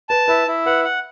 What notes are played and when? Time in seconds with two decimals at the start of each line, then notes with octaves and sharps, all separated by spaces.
0.09 B4 A5
0.28 E4 B4
0.48 E4
0.66 B4 F#5
0.85 F#5